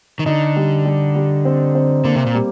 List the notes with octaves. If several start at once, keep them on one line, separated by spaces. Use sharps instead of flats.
D#3
D3 D#4
G3
G3
G3
C4
C4
D3 A#3
C3
A#2
G3